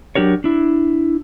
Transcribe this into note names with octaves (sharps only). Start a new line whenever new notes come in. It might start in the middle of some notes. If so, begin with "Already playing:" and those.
F#3 D4 G4 A#4 C#5
D4 E4